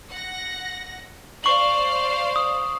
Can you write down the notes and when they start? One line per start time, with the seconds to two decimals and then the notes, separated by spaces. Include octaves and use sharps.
0.11 F#5 A#6
1.44 C5 D5 F5 C#6 F#7
2.36 D#6